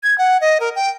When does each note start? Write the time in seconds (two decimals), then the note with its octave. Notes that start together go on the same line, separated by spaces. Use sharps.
0.03 G#6
0.18 F#5
0.41 D#5
0.60 A#4
0.76 G5